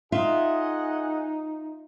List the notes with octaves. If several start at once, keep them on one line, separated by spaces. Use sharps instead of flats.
D#4 F4 G#4 D#5 E5 F#5